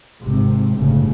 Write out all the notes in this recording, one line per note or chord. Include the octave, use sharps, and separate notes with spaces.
G#1 C3
G1 A2 C#3